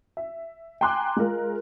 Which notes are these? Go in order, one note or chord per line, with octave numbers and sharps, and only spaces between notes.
E5
G5 G#5 A#5 C6 D6 F#6
G#3 F4 A#4